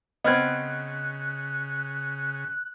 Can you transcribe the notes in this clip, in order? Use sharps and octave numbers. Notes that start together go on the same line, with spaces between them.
C#3 B3 C4 D#5 F6 F#6 G#6